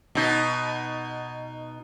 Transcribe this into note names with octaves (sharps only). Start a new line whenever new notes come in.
B2 D#4